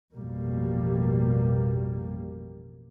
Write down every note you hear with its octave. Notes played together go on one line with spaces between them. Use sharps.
A1 F2 B2 G3 A#3